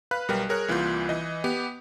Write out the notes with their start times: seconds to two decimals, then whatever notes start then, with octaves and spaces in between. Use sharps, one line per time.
0.11 B4 F5 B5 F#6
0.28 B1 G3 A#4 B4 G5
0.49 G#4 A#4 C#5 F#6
0.68 C2 E3 A#3 F4 G6
1.09 E3 D#5
1.44 B3 G4